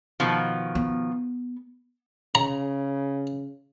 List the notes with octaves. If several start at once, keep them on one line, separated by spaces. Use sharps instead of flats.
B2 D#3 F3
B3
C#3 A#5